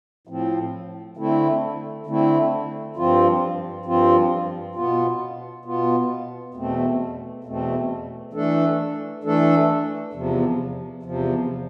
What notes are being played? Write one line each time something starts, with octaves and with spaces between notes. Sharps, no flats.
A2 F3 C4
D3 A3 C4 E4
D3 A3 C4 E4
G2 F3 C4 F4
G2 F3 C4 F4
B2 B3 F4
B2 B3 F4
E2 B2 A3 C4
E2 B2 A3 C4
E3 A3 D4 A4
E3 A3 D4 A4
E2 C3 F3
E2 C3 F3